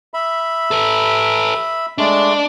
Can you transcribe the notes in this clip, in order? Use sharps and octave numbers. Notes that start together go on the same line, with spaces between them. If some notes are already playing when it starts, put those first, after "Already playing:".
E5 B5
A4 B4
G#3 A3 D4 D5